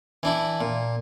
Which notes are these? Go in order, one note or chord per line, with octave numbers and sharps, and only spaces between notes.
E3 D4 E4
A#2